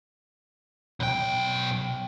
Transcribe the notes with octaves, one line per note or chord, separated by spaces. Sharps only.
B1 G5